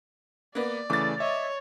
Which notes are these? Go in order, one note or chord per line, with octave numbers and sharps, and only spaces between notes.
A#3 B3 D5
C#3 E3 A3 D6 A6
C#5 D#5 E5